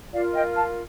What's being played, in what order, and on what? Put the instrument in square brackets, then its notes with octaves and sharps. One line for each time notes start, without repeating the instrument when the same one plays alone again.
[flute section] F4 A#4 D5 F5
D#5 G5
F5 A5